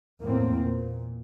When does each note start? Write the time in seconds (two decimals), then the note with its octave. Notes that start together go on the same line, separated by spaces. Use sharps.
0.20 E2 A2 A#3 C4
0.60 A#2